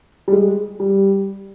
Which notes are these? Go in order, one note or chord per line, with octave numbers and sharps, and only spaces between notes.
G3
G#3
G3